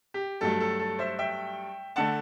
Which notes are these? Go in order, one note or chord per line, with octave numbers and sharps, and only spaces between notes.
G4
G2 F#3 A3 A4
A4
A4
C5 E5
E5 G5
D3 A3 F#5 A5